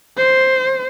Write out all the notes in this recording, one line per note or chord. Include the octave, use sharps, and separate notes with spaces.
C5